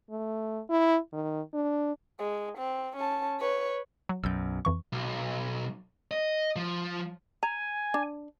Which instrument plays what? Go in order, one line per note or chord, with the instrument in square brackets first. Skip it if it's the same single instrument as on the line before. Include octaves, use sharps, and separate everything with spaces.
[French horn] A3
E4
D#3
D4
[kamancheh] G#3
C4
C#4 A5
B4 C#5
[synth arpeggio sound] F#3
[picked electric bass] B1 F#2 [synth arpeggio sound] E6 G6
[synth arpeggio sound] F2 E3 C#6
[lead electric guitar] B1
D#5
F3
[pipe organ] G#5 [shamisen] A#5
[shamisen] D4